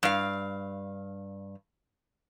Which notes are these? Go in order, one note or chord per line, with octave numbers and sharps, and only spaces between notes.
G2 F5